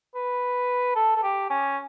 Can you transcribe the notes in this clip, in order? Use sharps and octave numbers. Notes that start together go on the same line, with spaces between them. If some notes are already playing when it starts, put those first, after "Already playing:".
B4
A4
A4
G4
C#4